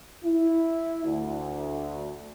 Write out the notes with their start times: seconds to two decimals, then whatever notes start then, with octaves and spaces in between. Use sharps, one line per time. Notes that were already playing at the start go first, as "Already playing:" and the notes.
0.25 E4
1.04 D2